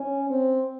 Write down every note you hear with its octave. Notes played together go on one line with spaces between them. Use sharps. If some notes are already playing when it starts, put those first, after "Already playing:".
Already playing: C#4
C4